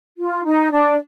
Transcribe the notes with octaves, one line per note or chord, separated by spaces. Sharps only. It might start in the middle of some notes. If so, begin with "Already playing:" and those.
F4
D#4
D4